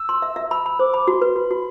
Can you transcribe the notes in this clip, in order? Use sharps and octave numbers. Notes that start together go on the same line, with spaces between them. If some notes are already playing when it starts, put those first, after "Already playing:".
Already playing: E6
C6
E5
E5
B5 E6
B5
C5 D6
B5
F#4 C6
B4
F#4 B5
F#4